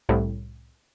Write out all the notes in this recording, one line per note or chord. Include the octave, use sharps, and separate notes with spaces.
C2 A2